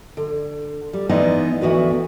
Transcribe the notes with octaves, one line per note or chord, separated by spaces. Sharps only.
D3
G3
E3 G#3 B3 D#4 E4 D5
D2 E3 B3 F#4 B4